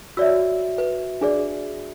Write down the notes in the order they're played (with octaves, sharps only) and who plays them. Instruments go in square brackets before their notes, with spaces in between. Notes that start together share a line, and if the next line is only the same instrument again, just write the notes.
[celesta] F#4 E5 [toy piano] C#5 D5 E6
[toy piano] B4
D4 G#4 D5